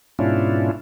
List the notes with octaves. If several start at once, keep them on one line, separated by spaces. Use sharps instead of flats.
G#2 B2 C#4 D4 E4 F4